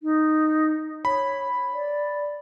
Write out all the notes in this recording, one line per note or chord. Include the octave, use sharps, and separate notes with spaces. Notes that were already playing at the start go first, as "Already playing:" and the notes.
D#4
C#5 B5
D5